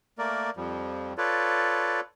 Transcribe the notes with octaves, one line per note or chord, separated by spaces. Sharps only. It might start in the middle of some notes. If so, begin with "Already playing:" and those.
A3 A#3 A#4 D5
F2 F3 G3
F4 A4 B4 C#5 D5